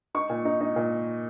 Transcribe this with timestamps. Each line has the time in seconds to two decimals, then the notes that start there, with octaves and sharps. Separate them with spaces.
0.15 D#4 C#6
0.30 A#2
0.45 D#4
0.61 D#4
0.76 A#2